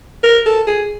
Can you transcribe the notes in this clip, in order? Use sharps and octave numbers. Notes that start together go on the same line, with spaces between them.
A#4
A4
G#4